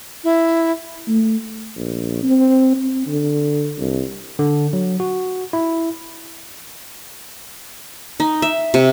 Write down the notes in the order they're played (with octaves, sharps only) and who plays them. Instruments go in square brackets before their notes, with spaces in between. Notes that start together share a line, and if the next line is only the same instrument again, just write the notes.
[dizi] E4
[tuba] A3
A#1
C4
C4
D3
C2
[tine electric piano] D3
F#3
F#4
E4
[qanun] D#4
E5
C3